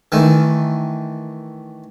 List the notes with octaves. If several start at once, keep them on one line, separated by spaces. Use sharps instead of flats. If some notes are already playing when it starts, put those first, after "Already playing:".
D#3 E3 A3